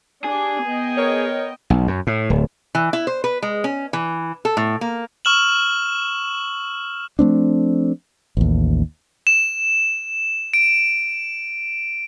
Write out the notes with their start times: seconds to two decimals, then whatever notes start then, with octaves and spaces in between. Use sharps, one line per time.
0.24 D4 G4 G#4
0.65 B3 D#5 G5
0.97 A#4 C#5
1.70 B1
1.87 F#2
2.07 A2
2.30 D1
2.75 E3
2.93 E4
3.07 C5
3.24 B4
3.42 G#3
3.64 C#4
3.93 E3
4.45 A4
4.57 A2
4.81 A#3
5.25 C#6 E6 F6 E7 F#7
7.19 F3 A3 C4 D4
8.37 A1 D#2
9.27 E7
10.54 D7